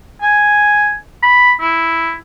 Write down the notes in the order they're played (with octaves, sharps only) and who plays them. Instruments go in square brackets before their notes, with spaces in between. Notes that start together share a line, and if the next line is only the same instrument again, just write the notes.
[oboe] G#5
B5
E4